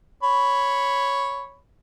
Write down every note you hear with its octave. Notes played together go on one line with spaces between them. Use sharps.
C#5 B5